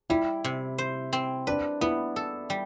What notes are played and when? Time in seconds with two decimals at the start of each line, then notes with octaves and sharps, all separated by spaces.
0.10 G3 E4
0.44 C3
0.78 C5
1.13 C4
1.47 D4 B4
1.81 B3 E4
2.16 A4
2.50 G3